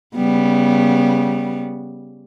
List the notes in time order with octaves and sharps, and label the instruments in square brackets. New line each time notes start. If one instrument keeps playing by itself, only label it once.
[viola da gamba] C#3 G3 B3